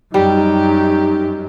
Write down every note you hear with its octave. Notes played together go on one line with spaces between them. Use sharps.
F#2 G3 D#4 G4